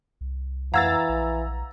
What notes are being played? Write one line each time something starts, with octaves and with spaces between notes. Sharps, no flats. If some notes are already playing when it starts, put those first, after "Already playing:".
C2
F2 E3 F5 F#5 A#5 E6 G#6 A6
A#1